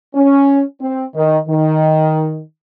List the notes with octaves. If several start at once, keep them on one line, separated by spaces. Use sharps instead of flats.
C#4
C4
D#3
D#3